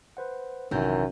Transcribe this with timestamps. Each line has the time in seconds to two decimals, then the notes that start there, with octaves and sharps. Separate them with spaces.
0.17 B4 C5 F#5
0.71 A#1 F#2 C3 D#3 E3 G6